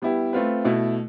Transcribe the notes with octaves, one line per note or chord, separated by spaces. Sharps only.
G3 B3 E4 G4
A3 C4 F4 B4
B2 A3 E4